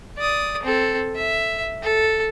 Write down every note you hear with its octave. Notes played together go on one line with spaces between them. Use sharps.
D5 D#6
C4 A4
E5
A4